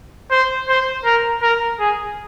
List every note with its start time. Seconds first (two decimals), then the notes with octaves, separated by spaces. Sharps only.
0.31 C5
0.69 C5
1.05 A#4
1.42 A#4
1.79 G#4